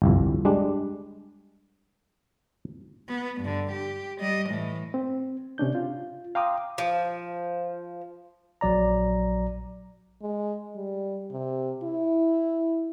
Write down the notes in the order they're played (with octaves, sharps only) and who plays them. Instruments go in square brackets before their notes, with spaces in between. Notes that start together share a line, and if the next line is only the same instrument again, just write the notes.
[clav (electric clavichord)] G1 C2 F2
G3 G#3 D4
[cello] B3
G2 D3
G4
G3 D#5
A2 E3
[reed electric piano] C4
C3 C#4 D4 G6
F4
F5 G5 A#5 C6 D6 D#6
[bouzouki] F3
[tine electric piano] A#1 F#3 D5 A#5
[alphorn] G#3
G3
C3
E4